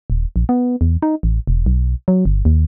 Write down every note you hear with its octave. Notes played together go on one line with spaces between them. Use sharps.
D#1
A#1
B3
E2
D#4
A1
E1
B1
F#3
G1
D#2